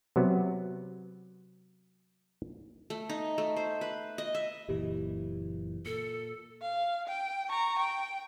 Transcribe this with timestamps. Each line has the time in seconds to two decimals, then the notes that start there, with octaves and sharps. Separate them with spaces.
0.16 C3 F#3 B3
2.90 A3
3.09 D#4
3.38 A3
3.56 C5
3.81 B4
4.18 D#5
4.35 E5
4.69 F#1 A#2 E3 G4
5.86 A#2 A4 C#7
6.62 F5
7.08 G5
7.49 A#5 C#6
7.79 G5